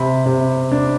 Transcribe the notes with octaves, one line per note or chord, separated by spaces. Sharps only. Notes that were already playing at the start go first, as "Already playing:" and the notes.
Already playing: C3 B5
C3
D4